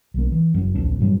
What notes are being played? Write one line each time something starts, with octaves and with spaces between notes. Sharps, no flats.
B1 A#3
E3
F#1 F#2
D1 A#1 F3 D4
G2 A#2 F#3 G3